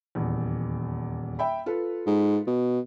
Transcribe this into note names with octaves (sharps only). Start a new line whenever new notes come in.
D#1 E2
E5 G5 B5
F4 A4 B4
G#2
B2